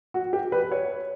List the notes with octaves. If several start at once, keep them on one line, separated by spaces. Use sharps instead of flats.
F#4
G4
B4
C#5